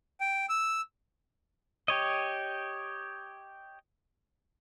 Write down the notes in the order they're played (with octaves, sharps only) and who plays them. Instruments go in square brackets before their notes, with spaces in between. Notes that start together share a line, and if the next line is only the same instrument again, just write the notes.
[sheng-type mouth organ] G5
E6
[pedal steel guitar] G4 C#5 D#5